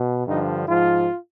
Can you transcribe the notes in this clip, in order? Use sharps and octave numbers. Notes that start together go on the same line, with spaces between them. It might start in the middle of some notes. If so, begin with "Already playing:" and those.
Already playing: B2
G2 D3 F3 D#4
G#2 F3 F4